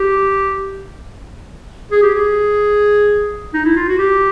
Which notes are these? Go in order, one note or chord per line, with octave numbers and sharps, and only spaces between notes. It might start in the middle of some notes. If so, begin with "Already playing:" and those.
Already playing: G4
G#4
G4
G#4
D#4
E4
F4
F#4
G4